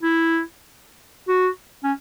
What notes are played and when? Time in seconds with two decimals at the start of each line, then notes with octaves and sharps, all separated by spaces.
0.03 E4
1.28 F#4
1.84 C#4